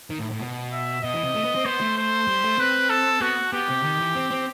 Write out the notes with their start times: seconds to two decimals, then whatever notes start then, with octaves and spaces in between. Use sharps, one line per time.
0.10 D#3
0.19 A2
0.31 A2
0.40 B2
0.73 E5
1.03 B2 D#5
1.14 E3
1.24 C3
1.34 A3
1.45 B3
1.55 C4
1.65 B3 C5
1.81 A3
1.97 C5
2.28 G3
2.44 A3
2.59 C4 B4
2.90 A4
3.21 B3 F#4
3.53 B3 G4
3.69 C3
3.83 D#3
4.00 E3
4.15 C4
4.31 C4